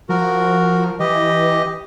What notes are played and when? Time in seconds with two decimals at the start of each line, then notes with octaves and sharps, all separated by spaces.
0.09 F3 F#4 A#4
0.99 E3 G4 D#5